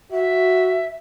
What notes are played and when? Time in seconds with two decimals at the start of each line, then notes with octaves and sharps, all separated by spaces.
0.12 F#4 E5